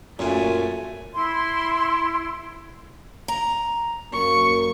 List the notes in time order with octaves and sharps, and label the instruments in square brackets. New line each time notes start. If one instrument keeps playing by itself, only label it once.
[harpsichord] F#2 [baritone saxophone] A#2 [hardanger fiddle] A3 G#5
[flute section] E4 C6
[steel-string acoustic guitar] A#5
[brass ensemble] F#2 A#3 [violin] C#6